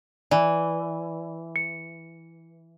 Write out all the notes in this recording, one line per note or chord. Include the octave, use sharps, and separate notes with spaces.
E3 D5
C#7